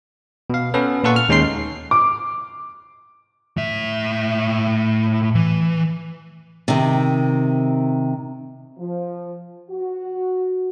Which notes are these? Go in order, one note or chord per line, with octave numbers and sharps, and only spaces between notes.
B2 F5
B3 C#4 A4 B4
A#2 F4 A4 F#5 C#6
F6
D#2 G#3 C#4 D#4 C6 C7
D6
A2 E5
E3
C3 D#3
F3
F#4